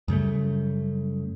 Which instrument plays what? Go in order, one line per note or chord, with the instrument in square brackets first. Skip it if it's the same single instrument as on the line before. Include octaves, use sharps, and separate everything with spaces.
[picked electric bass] F#2 C#3 G3 A3